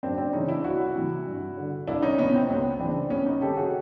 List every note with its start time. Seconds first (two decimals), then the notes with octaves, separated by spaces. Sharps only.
0.03 F#2 C4 D4
0.18 C4 D4
0.33 C#3 E3 C#4 D#4
0.48 D4 E4
0.64 C2 E4 F#4
0.95 C3 E3
1.26 G2
1.57 D3
1.87 C2 D4 E4
2.02 C#4 D#4
2.18 B2 B3 C#4
2.34 C4
2.49 C#2 B3
2.79 C#3 E3 C4 D4
3.10 C2 B3 C#4
3.26 C#4 D#4
3.41 C3 D#3 G4 A4
3.57 F#4 G#4